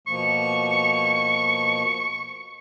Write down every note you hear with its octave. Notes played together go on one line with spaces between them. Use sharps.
B2 F3 A#3 C#6